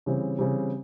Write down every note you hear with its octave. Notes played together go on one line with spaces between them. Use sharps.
C#3 E3 G3 C4
C#3 E3 G3 C4